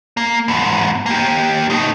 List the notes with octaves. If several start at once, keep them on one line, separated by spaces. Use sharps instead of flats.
A#3
E2 G#2
A#3 G4
A2 D#4